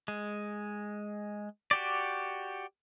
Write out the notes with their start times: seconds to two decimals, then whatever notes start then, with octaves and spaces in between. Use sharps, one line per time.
0.08 G#3
1.71 F#4 G4 D5